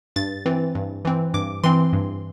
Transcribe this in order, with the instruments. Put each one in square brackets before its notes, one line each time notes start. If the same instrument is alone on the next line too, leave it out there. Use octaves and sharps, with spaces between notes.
[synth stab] G2 A6
E3 C4
G2
E3 C4
G2 D6
E3 C4 C6
G2